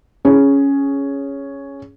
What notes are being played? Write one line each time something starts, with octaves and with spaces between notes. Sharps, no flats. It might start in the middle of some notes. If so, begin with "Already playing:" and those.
C#4 G#4